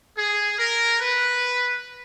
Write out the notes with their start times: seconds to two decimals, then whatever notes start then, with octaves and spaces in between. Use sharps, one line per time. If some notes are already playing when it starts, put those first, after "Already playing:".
0.17 G#4
0.59 A#4
1.00 B4